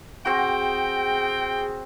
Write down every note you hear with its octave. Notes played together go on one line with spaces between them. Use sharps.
C4 F#4 G#4 G5